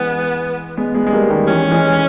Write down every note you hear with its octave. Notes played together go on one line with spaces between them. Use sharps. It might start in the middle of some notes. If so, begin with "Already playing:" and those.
Already playing: E3 G#3 B3
G#3 B3
G#3 B3
G#3
G3 A#3
D#3 G3
E3 C#4
E3 G#3